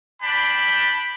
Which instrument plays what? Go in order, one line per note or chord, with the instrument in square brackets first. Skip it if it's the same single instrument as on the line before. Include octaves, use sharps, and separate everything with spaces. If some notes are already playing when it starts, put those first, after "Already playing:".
[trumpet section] D4 G5 B5